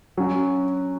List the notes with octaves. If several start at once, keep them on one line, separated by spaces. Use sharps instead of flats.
F#3 C#4 F#4